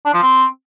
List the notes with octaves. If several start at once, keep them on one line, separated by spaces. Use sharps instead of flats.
D4
F3
C4